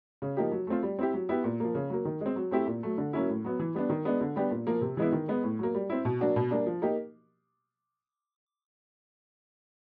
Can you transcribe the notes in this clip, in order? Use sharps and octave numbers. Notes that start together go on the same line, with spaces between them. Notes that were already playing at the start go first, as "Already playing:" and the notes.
C#3
F3 A#3 D#4 G4
F#3
A3 C4 F4
G3
C4 E4 G4
F#3
B3 E4 G4
A#2
F3 A#3
C#3
F#3 A#3
D#3
G#3
C4
F#3
A3 C4 E4 G4
A#2
F#3 A3
D3
F#3 A#3 C#4 E4
A2
F#3 B3
E3
G3 B3 D4
D#3
G#3 B3 D4
D3
G3 B3 D4 G4
A#2
F3 A#3
C3
E3 G#3 B3 E4
D#3
G#3 B3
A2
F#3 A#3
G3
C4 E4
B2
F#3 A#3 D4 F#4
B2
G3 A#3 D4
F3
A#3 D#4 G4